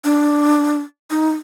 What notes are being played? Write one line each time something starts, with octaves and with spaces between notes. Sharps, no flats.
D4
D#4